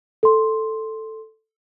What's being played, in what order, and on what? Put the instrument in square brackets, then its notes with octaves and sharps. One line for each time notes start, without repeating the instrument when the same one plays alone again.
[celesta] A4 C6